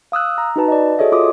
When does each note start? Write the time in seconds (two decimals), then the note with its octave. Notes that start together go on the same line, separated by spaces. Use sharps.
0.12 F5 D#6 E6 F#6
0.38 A#5
0.56 D#4 F#4 B4 A5
0.68 D5 D#5
0.98 F#4 G#4 A4 C#5 D#5 E5
1.12 F4 D6 D#6